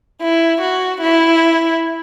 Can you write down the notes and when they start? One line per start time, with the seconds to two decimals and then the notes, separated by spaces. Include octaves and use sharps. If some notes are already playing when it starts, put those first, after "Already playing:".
0.22 E4
0.61 F#4
1.00 E4